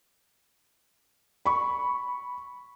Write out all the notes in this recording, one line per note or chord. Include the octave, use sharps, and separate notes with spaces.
B5 C#6